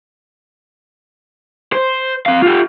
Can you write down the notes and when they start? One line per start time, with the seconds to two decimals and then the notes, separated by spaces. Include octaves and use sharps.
1.73 C5
2.26 C4 F5
2.42 F4 G4